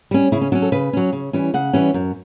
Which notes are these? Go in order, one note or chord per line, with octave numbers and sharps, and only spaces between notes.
G3 C#4
C#3 E4
C#4
F#3 C#4 D4
A4
C#3 B4
F#3 C#4
C#3
E3 G3 C#4
C#3 F#5
E3 G3 C#4
F#2